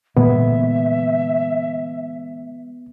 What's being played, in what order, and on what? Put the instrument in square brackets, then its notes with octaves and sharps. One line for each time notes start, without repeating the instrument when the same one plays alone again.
[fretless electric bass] A#2 [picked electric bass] D3 E3 G#3 [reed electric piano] B3 [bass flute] E5